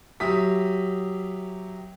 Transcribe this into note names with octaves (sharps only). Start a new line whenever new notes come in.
F#3 G4 E5 D#6 B6